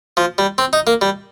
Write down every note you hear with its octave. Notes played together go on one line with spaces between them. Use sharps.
F3
G3
C4
D#4
A#3
G3